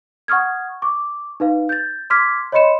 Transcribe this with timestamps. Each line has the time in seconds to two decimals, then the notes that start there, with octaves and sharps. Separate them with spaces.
0.28 F#5 C#6 D#6 F6 G#6
0.82 C#6 D6
1.40 D#4 B4 F5
1.69 G6 A6
2.10 C6 D6 F6 G#6 B6
2.52 C#5 D#5 B5 C6 C#7 E7